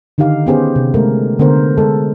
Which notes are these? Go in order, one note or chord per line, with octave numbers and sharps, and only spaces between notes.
D3 D#3 D#4 G4 F5
B3 C#4 G4 G#4 B4 C5
C3
G#3 A3 A#4
D3 B3 A#4 C5
G#3 A4